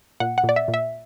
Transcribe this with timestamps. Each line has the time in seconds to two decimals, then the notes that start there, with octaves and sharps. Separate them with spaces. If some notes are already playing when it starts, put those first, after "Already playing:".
0.20 A#2 F#5
0.38 F#5
0.44 A#2
0.49 D5
0.56 E5
0.68 A#2
0.74 E5